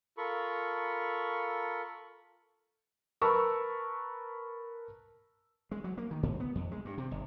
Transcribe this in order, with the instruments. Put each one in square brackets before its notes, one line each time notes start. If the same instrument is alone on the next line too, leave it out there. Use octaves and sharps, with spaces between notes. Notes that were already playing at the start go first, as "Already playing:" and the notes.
[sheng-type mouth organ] F4 A4 A#4 B5 C#6
[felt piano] A#4 B4 A5 B5 C#6 E6
[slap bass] G#3
F#3
A#3
D#3
G#2
B3
F2
G#3
G2
C3
G1